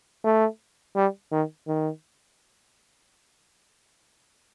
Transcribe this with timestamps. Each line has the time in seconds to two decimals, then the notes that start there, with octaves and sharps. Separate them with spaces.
0.24 A3
0.96 G3
1.32 D#3
1.67 D#3